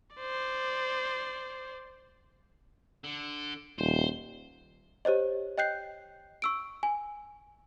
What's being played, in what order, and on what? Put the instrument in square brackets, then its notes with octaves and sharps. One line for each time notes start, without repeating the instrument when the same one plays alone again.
[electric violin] C5 D5
[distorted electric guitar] D3
[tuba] D#1 [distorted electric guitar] C5
[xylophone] G4 C5 C#5 D#5
D#5 G5 F#6 G6 C7
C#6 E6 D7
G#5